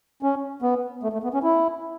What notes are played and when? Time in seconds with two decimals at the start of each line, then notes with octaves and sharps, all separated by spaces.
0.23 C#4
0.62 B3
1.03 A3
1.13 A3
1.24 B3
1.34 C#4
1.43 E4